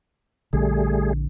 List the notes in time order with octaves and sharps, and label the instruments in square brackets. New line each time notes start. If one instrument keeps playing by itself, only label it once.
[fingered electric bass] A#1 D3 [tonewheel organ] G3 A3 G#4